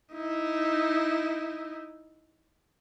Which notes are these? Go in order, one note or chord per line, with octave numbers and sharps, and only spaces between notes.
D#4 E4